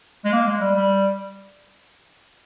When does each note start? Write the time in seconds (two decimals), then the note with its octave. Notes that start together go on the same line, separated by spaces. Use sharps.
0.24 G#3
0.32 A#3
0.47 G#3
0.61 G3
0.75 G3